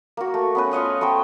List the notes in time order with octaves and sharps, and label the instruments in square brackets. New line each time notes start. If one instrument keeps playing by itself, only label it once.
[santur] A#3 F#4
A3
B3 C#4 B4
F4 C#5 D#5 F5
A3 B3 C5 G5